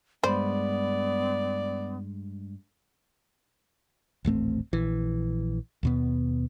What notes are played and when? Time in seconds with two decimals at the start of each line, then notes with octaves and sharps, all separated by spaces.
0.23 G2 G#3 B3 C5 D5 B5
4.25 D#1 A1 A3 C4
4.73 A#1 E3
5.83 D#2 B2 B3